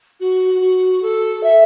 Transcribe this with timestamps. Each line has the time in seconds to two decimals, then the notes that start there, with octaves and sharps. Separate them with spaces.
0.20 F#4
0.61 F#4
1.02 A4
1.43 E5